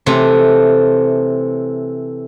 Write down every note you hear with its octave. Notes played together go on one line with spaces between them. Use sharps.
C3 E3 A3 C4